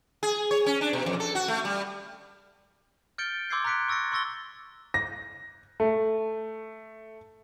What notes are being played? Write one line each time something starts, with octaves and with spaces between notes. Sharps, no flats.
G#4
C#5
C#4
D4
B2
F2
A4
F#4
A3
G3
F6 G6 A6 C#7 D7 G7
C6 D6 E6 G6 G#6 C7
A#5 D6 F#6 B6 C#7 D7
C#6 E6 A6 A#6 C#7
C6 C#6 E6 A6 A#6 G7
A#6
A3